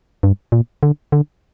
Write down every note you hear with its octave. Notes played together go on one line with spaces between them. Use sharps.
G2
A#2
D3
D3